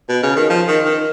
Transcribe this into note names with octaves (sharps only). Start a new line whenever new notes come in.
B2
C#3
D#3
F3
D#3
D#3